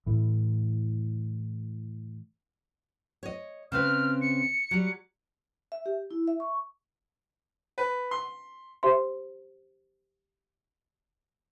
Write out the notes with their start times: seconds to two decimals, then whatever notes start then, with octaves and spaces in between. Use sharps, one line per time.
0.06 A2 E3
3.23 C#5 D#5
3.72 C#3 C4 B4 F6
4.22 C#7
4.71 F#3 G3
5.72 E5
5.86 G4
6.11 E4
6.28 E5
6.40 C#6
7.78 B4
8.11 C6
8.83 G4 C5 E5 C6